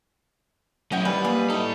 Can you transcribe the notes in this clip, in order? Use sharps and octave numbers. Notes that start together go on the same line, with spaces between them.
F#3 C#4 E4 D#5 F#5 G5
D#3 G3 G#3 B4
B2 A#3 F4 G#4
D#4 E4 A4